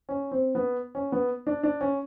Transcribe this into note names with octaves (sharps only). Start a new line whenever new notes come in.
C#4
C4
B3
C#4
B3
D4
D4
C#4